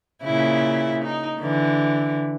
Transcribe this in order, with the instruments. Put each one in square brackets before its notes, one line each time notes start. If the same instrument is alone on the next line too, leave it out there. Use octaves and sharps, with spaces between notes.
[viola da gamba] A#2 C#3 E4
D#4
D3 E3